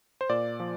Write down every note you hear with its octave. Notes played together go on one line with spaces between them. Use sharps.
C5
A#2 D5
F3